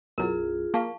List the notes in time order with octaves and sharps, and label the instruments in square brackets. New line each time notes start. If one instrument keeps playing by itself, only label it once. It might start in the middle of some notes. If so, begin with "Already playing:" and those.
[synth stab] B1 F#2 [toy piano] E4 A#4 [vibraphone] F4 G#4
[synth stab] A#3 [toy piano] F5 A5 C#6